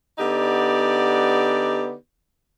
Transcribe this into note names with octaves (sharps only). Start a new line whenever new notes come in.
D3 B3 D#4 G4 D5